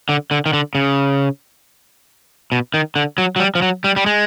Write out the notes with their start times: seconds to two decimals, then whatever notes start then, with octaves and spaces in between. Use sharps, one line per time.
0.09 D3
0.31 D3
0.46 D#3
0.53 D3
0.75 C#3
2.52 B2
2.74 D#3
2.96 D3
3.18 F#3
3.36 F#3
3.40 G3
3.55 F3
3.62 F#3
3.84 G3
3.96 G3
4.06 G#3